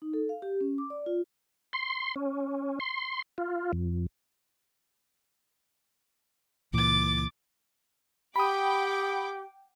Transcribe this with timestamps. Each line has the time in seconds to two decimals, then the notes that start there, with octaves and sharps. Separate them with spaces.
0.02 D#4
0.14 A4
0.29 F5
0.42 G4
0.61 C#4
0.78 D6
0.90 D5
1.06 F4
1.73 C6
2.16 C#4
2.80 C6
3.38 F4
3.73 F2
6.73 C#2 A#2 E3 D6 A6
8.36 G4 F#5 G5 B5 D6 D#6